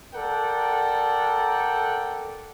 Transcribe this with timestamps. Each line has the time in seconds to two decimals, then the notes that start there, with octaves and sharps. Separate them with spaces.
0.14 A4 A#4 D5 F#5 G5